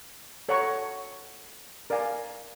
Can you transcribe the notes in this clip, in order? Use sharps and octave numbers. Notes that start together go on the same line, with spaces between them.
A4 C#5 F#5 A#5 C#6
A#4 D5 F5 G#5